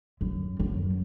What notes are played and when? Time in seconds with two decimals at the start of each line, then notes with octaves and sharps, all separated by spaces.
0.21 F#2
0.60 F#2